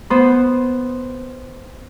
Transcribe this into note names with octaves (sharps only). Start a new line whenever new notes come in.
B3 C5